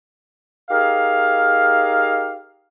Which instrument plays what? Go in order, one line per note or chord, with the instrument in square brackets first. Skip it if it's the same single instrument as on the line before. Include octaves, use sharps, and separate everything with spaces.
[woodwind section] D#4 G4 G#4 A#4 F5